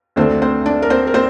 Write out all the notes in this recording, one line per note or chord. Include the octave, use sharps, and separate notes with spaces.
D2 D3 A3 C4 D4 C5
C4 C5
D4 D5
A#4
C4 C5
A#4
C4 C5